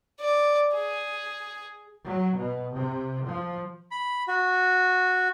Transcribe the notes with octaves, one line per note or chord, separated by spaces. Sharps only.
D5
G#4
F#3
B2
C3
F3
B5
F#4